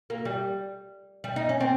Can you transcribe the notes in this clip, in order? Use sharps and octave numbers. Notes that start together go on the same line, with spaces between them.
A#3
G3
G3
D#4
C#4
C4